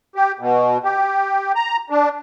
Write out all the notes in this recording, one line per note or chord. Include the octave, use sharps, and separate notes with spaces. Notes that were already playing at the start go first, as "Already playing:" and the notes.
G4
B2
G4
A#5
D4